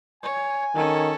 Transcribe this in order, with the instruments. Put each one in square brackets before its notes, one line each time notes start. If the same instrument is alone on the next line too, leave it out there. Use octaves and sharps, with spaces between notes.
[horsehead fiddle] C#5 [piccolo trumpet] G#5
[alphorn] D#3 [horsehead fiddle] C#4 A4